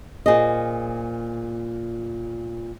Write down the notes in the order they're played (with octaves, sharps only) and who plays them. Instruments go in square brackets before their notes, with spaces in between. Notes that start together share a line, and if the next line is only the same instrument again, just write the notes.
[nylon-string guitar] A#2 G#4 C5 D#5